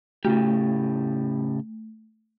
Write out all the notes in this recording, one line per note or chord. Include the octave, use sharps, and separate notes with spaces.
A2 C#3 A3 G4